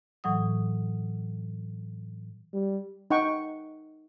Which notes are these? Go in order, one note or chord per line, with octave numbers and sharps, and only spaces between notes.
A2 E3 F#3 F#5 D#6
G3
D#4 F#5 G5 C#6